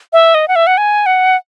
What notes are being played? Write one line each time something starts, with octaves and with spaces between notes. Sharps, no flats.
E5
D#5
F#5
E5
F#5
G#5
F#5